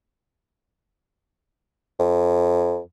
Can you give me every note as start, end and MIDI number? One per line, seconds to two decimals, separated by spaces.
1.99 2.79 41